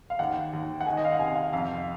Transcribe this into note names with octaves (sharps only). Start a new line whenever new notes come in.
F5
D#2 F#5
D#2
F#5
D#3 G#5
D#5
F5
F#5
C3 G#5
F5
F2 F5